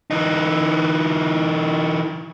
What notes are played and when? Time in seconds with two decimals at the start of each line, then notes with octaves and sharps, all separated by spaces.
0.11 E3 D#4